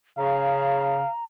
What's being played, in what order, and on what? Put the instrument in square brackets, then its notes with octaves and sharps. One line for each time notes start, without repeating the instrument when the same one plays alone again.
[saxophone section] C#3 [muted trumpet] F5 [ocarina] A#5